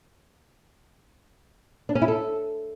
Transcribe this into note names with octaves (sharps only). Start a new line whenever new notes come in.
D4
C#4
E4
A4